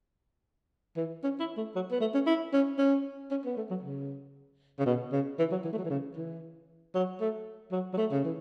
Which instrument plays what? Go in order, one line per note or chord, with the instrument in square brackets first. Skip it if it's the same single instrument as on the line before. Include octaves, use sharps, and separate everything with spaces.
[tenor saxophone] E3
C#4
E4
A3
F#3
B3
A3
C#4
E4
C#4
C#4
C#4
B3
A3
F#3
C#3
C#3
B2
C#3
E3
F#3
E3
A3
F#3
E3
C#3
E3
F#3
A3
F#3
F#3
A3
C#3
E3